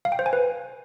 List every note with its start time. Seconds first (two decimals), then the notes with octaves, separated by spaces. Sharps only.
0.05 F5
0.12 G5
0.19 C5
0.26 G#5
0.33 B4